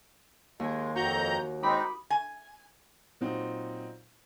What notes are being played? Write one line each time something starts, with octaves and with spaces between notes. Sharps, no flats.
D#2 G#3 G#5
F2 F#4 A#5 G6
G#3 C4 D#4 B5 D6 D#6
G#5
A#2 F#3 C4 D#4